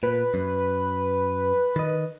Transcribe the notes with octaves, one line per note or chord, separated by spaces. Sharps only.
A#2 B4
F#2
D#3 D#5